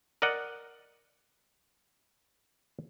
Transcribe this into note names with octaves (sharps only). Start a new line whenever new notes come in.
A#4 D5 D#5 F#5